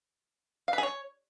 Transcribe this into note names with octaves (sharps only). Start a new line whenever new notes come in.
F5
B4
G#4
C#5